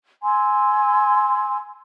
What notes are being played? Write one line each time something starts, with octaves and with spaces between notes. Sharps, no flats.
G#5 C6 E6